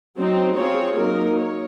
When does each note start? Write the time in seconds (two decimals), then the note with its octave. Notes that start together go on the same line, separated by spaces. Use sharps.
0.16 F#3 C4 D#4
0.55 C4 F4 G#4 C#5
0.96 F#3 A#3 D#4 A#4
1.37 C#5